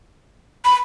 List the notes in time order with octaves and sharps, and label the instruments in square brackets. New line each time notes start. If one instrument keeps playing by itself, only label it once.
[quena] B5